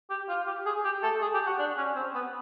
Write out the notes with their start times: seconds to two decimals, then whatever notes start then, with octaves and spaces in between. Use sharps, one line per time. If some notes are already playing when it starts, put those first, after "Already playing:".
0.10 G4
0.29 F4
0.47 G4
0.66 G#4
0.84 G4
1.03 A4
1.21 G#4
1.34 G4
1.46 F#4
1.59 D4
1.77 C#4
1.96 C4
2.15 B3